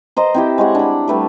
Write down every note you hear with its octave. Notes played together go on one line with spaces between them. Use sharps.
C5 D#5 A#5 C6
C4 E4 G4
G#3 C#5 F#5
D4 B5
G3 A3 B4